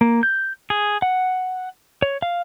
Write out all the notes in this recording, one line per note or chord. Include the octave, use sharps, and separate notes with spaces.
A#3
G6
G#4
F#5
C#5
F5